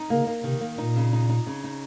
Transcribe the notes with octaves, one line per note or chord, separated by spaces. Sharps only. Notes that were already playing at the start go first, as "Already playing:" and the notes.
Already playing: D#4
C#3 A#3
A#3
C3 D#3
A#3
A#2 D#4
C#3
D#4
D#4
C#3
D#4